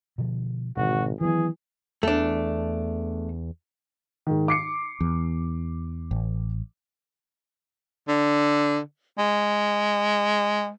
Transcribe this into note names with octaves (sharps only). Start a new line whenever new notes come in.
B2 D3 F3
G#1 B2 D3 E3 F#4
D#3 E3 F#3 B3 G#4
E2 A3 D4
G#2 D#3
D6 C7 C#7
E2
A1
D3
G#3